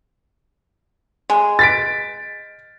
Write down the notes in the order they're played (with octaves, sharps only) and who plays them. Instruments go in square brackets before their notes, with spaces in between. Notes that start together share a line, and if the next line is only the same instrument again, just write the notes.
[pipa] G#3
[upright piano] A6 B6 D7